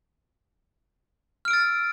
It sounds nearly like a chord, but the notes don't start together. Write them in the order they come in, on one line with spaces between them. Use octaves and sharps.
F6 D7 E6 A6